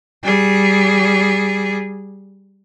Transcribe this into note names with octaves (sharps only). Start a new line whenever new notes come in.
G3 G#4